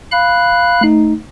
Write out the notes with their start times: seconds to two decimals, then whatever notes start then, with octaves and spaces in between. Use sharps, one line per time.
0.12 F5 B5 F#6
0.81 A3 D#4